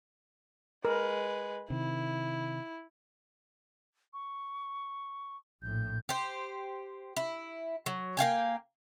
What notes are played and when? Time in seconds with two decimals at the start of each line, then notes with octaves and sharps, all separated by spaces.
0.85 G#3 A#4 B4
1.70 C3 D#3 E4
4.13 C#6
5.62 A#1 A2 G6
6.09 G4 C5
7.17 E4
7.86 F#3
8.17 A#3 F5 G5 G#5